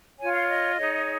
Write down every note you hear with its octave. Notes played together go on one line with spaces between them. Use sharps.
F4 C#5 G#5
F5
D#5
D#4 G#4 C#5